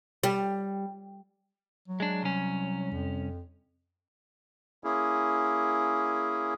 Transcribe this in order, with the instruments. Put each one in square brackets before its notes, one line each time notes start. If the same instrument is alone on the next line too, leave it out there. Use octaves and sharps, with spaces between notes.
[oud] G3
[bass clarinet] F#3
[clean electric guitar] G#3 D4
C2 C#4
[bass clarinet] F2
[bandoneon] A#3 C#4 E4 G#4